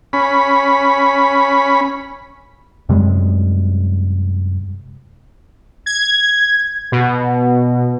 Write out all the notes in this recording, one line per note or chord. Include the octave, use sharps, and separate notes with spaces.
C#4 B5
F#2 C3 G3 G#3
G#6
B2